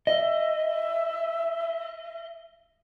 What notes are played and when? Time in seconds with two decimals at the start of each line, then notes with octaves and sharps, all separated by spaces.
0.07 D#5 E5